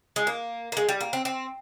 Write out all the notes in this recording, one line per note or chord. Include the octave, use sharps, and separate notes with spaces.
G#3
A#3
A#3
G#3
G3
A#3
C4
C4